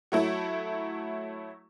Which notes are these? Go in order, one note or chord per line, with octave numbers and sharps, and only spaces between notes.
F#3 A3 E4